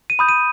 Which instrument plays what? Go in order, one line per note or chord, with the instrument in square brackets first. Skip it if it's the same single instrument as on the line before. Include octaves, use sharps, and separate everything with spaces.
[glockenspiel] D#7
B5 D#6 G6
D#7